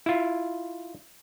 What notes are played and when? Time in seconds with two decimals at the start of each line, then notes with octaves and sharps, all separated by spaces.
0.06 E4 F4